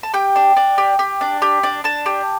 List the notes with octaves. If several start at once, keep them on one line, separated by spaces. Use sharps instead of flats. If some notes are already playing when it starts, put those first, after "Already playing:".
A5
G4 G5
D4
D4
G4
G4
D4
G4
D4
D4 A5
G4